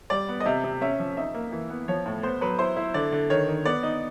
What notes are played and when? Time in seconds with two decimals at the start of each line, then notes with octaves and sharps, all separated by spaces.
0.10 G3 D5
0.29 B3
0.40 D#5
0.46 C3 E5
0.64 C3
0.81 C#4 E5
0.99 F3
1.17 D#4 E5
1.34 A#3
1.52 E3
1.70 B3
1.88 F3 C#5
2.06 A2
2.23 B3 C5
2.41 F#3 B4
2.59 E4 C5
2.76 E4
2.94 D3 D5
3.12 D3
3.30 D#3 C#5
3.48 D#3
3.65 B3 D5
3.83 D#4